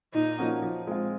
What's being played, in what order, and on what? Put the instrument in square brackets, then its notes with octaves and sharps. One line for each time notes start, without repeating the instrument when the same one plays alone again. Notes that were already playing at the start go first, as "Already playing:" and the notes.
[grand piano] A#2 [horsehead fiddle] D#4
[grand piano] F3 A#3 C#4 F#4
F3
G#3 C4 F4